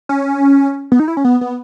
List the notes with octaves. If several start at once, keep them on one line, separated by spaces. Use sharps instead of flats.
C#4
B3
D#4
E4
C#4
B3
B3